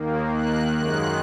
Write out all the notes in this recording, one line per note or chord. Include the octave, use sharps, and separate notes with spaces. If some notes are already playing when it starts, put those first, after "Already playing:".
Already playing: D#2 D#3 A#3
F#6
F#2 D#3 G#3 F#6